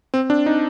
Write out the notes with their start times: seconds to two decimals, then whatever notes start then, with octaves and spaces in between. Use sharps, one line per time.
0.14 C4
0.30 D4
0.46 D#4